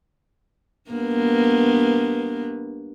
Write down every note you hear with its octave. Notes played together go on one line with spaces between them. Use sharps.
G2 A#3 B3